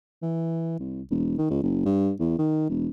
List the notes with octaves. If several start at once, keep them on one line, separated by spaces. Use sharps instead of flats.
E3
C2
E1
D#3
C#2
F#1
G2
E2
D#3
E1